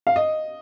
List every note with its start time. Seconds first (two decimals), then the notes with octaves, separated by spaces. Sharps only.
0.07 F5
0.16 D#5